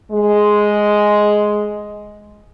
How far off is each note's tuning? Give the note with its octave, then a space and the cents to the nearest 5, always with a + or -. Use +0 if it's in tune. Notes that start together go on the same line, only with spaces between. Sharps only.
G#3 +5